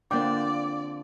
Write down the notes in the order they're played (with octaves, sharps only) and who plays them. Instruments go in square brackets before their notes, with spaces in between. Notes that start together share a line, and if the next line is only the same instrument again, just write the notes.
[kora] D3 F3 C4 [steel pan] A#3 G5 [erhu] D5 [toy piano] D6